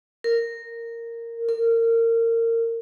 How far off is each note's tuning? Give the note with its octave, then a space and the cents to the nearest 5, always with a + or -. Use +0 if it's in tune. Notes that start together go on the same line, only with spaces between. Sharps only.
A#4 -10
A#4 -25